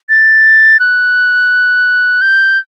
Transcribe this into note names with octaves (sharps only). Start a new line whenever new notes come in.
A6
F#6
G6